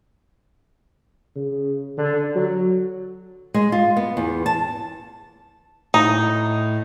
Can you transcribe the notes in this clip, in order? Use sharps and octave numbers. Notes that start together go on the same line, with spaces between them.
C#3
D3
F#3
G#3
F4
B3
E2
A5
A2 D#4